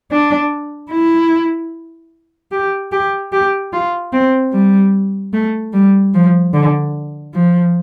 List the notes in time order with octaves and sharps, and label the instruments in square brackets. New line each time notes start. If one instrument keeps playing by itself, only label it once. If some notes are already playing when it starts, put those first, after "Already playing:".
[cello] D4
E4
G4
G4
G4
F4
C4
G3
A3
G3
F3
D3
F3